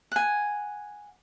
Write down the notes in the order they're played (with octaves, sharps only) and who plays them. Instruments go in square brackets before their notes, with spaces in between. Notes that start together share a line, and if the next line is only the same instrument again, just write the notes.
[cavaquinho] F#5 G#5